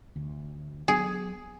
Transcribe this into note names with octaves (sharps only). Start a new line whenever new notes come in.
D2
F#3 B3 G#4